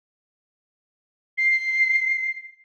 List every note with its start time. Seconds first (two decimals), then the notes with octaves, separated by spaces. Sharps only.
1.38 C7